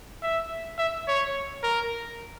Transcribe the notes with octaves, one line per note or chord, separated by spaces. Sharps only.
E5
E5
C#5
A#4